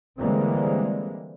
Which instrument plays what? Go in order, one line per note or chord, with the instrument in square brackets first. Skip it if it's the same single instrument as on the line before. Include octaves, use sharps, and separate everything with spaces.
[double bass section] D3 E3 G3 G#3 A#3 C4